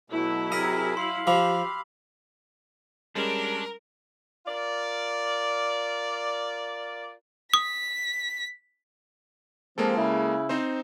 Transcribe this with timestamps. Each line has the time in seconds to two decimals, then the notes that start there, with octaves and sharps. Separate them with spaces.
0.10 B2 E3 F#3 A3 E4
0.52 C3 G#4 A#4 D#5 E6 B6
0.97 F5 C6 F#7
1.27 F3 G4 B5 D6 E6
3.15 G3 G#3 C#4 D4 A#4
4.46 F4 A#4 D5
7.54 D#6 B6
9.78 F3 G#3 A#3 C4 A4
9.97 C#3 E4
10.49 C4 D#4 C5